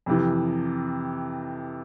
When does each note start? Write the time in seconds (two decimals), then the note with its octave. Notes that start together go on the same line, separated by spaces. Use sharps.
0.06 F2 C3 E3